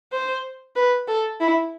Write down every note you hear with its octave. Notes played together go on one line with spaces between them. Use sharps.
C5
B4
A4
E4